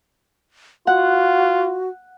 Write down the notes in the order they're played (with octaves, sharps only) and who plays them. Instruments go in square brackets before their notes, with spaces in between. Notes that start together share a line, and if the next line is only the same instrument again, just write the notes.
[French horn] F4 [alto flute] F#4 [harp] F#5